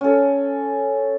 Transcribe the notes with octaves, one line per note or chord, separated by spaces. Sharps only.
C#4 A4